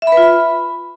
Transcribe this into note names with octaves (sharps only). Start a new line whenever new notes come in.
E5
B5
B4
F4
B5